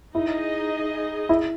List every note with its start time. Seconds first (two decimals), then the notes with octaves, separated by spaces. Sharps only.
0.14 D#4 E4 G#4 D#5
1.29 E4